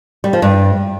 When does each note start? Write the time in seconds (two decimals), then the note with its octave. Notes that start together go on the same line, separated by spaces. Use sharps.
0.24 G3
0.33 F3
0.42 G2